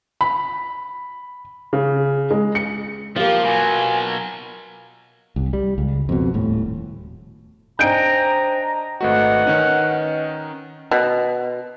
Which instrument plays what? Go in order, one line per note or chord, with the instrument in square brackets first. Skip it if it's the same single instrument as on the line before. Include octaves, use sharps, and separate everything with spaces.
[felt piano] B5
C#3
G#3
C#7
[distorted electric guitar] F3 [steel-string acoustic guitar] A#3 F4 [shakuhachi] G4
[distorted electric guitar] B2 F#3 [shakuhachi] G#5
[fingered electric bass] C2
G3
C#2
F2 B2
D#1 A2
[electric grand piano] D4 D#5 G#5 [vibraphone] C5 G5 [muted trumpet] A#5 [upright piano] G6 D7
[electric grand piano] G#1 A3 F#4 [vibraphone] B4 D#5 [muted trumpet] F#5
[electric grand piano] D#3 C#4 D#4
[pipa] B2